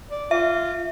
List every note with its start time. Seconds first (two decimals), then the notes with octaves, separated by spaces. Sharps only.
0.11 D5
0.31 F4 E5